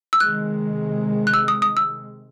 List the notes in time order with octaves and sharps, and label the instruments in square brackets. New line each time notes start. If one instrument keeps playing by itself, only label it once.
[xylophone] E6
[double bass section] C3 D#3 G#3 [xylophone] F#6
[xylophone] F#6
E6
D#6
D#6
E6